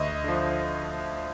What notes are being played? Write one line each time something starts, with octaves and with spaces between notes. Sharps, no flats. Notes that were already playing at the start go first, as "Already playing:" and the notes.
Already playing: D2 D#5
D3 F3